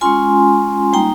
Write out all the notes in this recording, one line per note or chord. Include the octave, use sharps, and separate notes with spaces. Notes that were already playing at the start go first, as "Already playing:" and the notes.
G#3 C#4 F4 G#5 C6
G3 A#3 D#4 G5 A#5